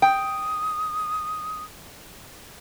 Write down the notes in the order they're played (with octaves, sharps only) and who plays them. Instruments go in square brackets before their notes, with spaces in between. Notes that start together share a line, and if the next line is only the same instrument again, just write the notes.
[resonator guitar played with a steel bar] G5 [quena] D#6